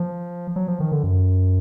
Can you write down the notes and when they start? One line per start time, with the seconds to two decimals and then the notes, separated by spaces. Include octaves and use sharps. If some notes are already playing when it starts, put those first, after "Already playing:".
Already playing: F3
0.56 F#3
0.68 F3
0.80 D#3
0.92 D3
1.03 F#2